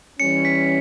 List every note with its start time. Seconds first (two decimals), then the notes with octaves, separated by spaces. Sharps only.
0.19 E3 G3 C#4 C#7
0.45 B6